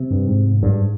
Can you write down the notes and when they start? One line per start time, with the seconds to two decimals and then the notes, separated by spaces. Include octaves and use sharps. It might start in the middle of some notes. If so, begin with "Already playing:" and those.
Already playing: C3
0.10 G2
0.28 G#2
0.63 G2